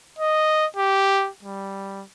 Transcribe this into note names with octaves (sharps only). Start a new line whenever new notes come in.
D#5
G4
G3